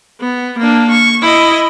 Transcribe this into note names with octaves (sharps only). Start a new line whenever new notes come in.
B3
A#3 D4
C#6
E4 D#5